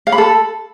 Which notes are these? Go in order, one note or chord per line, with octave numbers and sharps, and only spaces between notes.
F5
B5
A4